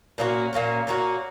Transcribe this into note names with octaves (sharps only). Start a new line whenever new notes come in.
A#2 A#3 C#4 F#4
A#2 A#3 C#4 F#4
A#2 A#3 C#4 F#4